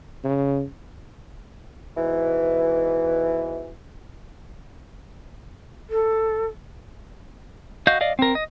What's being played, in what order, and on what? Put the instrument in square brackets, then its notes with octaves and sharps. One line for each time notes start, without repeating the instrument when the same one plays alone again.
[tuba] C#3
[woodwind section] G#2 B2 E3
[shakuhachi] A4
[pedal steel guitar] F#4 D#5 F5 G6
D5 D#5 F5
C4 A#4
D#5